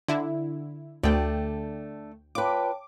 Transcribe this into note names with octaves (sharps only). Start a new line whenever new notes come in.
D3 E4
D2 A3 D4 D5 G5
F4 B4 C#5 G5 A5 D6